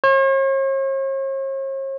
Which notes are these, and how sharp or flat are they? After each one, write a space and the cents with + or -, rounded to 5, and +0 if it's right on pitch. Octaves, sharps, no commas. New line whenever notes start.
C#5 -45